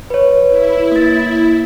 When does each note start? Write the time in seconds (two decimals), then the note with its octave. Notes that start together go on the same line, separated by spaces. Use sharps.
0.10 B4 C#5
0.48 E4
0.92 A#3 A6